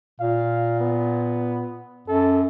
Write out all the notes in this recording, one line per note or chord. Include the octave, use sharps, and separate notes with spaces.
A#2 F5
B3
F#2 A4